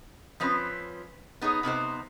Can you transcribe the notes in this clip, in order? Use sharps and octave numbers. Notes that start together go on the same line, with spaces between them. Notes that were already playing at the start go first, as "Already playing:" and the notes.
F3 C4 C#4 B4
B3 D#4 G#4 C#5
C3 B3 D#4 C5